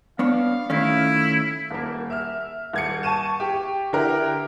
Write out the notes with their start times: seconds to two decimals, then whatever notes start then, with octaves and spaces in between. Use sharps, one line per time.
0.19 B3 D4 C#5 F5
0.70 D#3 A3 C#4 E4
1.71 D#1 A#3
2.10 E5 F6
2.73 D#1 G#6 C#7
3.03 A5 C#6 D#7 E7
3.40 G4
3.93 D3 E4 G4 A#4